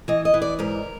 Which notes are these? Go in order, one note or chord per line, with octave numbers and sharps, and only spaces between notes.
E3 D#5
D#5
E3
D5
G#2 A#4